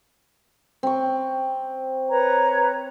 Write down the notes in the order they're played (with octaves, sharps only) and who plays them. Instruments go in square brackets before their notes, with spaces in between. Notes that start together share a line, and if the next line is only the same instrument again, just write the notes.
[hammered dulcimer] C4 C#6
[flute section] B4 C#5 A#5